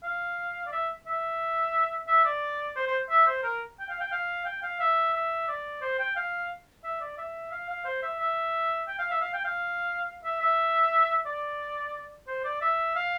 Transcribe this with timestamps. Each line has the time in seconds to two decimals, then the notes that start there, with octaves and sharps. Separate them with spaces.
0.03 F5
0.67 D5
0.72 E5
1.07 E5
2.08 E5
2.25 D5
2.76 C5
2.87 C5
3.10 E5
3.27 C5
3.43 A#4
3.80 G5
3.89 F5
4.01 G5
4.12 F5
4.45 G5
4.63 F5
4.80 E5
5.13 E5
5.48 D5
5.82 C5
5.99 G5
6.16 F5
6.84 E5
7.01 D5
7.18 E5
7.52 F5
7.69 F5
7.85 C5
8.03 E5
8.19 E5
8.88 G5
8.99 F5
9.11 E5
9.21 F5
9.34 G5
9.45 F5
10.24 E5
10.41 E5
11.26 D5
12.28 C5
12.45 D5
12.61 E5
12.96 F5